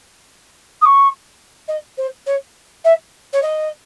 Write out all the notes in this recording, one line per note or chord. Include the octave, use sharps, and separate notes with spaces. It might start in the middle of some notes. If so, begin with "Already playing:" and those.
D#6
C#6
D#5
C5
C#5
E5
C#5
D#5